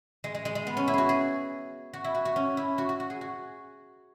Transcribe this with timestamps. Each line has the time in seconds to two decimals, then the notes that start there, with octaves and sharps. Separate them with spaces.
0.24 G#3
0.35 G#3
0.45 G#3
0.55 G#3
0.67 B3
0.77 C#4
0.88 E4
0.94 F#4 G#4
1.09 G#4
1.93 F#4
2.04 E4
2.15 F#4
2.25 F#4
2.36 C#4
2.57 E4
2.78 F#4
2.89 F#4
3.00 F#4
3.10 G#4
3.21 F#4